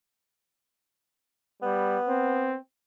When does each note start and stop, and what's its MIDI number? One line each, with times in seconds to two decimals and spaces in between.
1.63 1.98 55
1.63 2.56 59
2.08 2.57 60